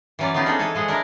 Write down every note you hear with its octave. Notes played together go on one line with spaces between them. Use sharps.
E3 F#3 C#4 C#5 D5
B3 C#4 D#4 F4 G4 G#4
C4 D4 D#4 G#4 A4
E3 A4 C#5 G#5
F3 G#3 G#4 F#5
D4 E4 A#4 D5